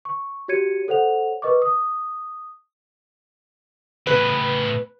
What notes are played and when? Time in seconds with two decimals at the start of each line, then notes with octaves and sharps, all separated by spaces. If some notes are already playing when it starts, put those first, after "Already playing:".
0.05 C#6
0.48 F#4 G4 C#5 G#6 C#7 D#7
0.88 A4 C5 C#5 F#5 F7
1.42 A#4 B4 D#5 C#6 D6
1.62 D#6
4.07 A2 C#3 B4